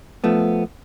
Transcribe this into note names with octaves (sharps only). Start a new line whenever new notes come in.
F3 A3 B3